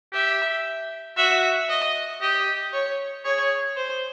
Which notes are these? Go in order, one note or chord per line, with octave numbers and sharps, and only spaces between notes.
G4 E5
F#4 E5
D#5
G4 D#5
C#5
G#4 C#5
C5